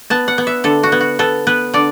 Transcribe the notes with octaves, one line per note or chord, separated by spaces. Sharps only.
B3 A5
F#5
B3
E5
D3 A4
F#4
B3
F#4
B3 A4
B3 B4
D3 D5